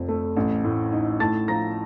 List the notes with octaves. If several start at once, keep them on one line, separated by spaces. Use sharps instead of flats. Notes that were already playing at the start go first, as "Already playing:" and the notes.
Already playing: F1 F2
A3
A1
A2
D#4
A2 A5 A6
F3 A#5 A#6